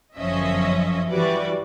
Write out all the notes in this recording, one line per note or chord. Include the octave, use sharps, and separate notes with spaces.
G1 F#2 F3 C#4 D#5 E5
E3 G3 F#4 B4 D5